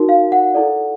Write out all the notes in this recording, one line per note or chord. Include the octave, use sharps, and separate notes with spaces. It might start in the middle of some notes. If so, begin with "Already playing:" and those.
Already playing: D#4 F#4 A#4
F5
F#5
E4 A4 D5